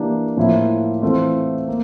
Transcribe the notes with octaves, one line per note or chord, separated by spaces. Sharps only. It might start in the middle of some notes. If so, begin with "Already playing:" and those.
Already playing: E3 A#3 D4 G4
A2 F3 A#3 E4
E3 A3 C4 F4
A#3